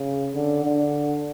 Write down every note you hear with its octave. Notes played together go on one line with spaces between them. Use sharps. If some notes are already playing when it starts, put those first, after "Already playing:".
Already playing: C#3
D3
D3